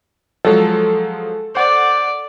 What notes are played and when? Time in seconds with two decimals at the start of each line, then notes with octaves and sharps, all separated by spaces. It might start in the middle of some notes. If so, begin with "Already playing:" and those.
0.45 F3 F#3 G#3 A4
1.55 C5 D5 F#5